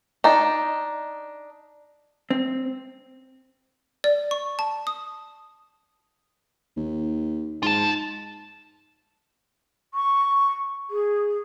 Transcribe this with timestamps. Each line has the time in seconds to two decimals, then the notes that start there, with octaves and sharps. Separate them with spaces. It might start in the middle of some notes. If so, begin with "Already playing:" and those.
0.24 D4 D#4
2.31 C4
4.04 D5
4.31 C#6
4.59 A5
4.87 D#6
6.77 D#2
7.63 G#2 F4 A5
9.94 C#6
10.90 G#4